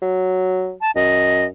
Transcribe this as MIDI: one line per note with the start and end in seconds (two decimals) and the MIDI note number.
0.01 0.73 54
0.81 0.91 81
0.95 1.47 42
0.95 1.45 75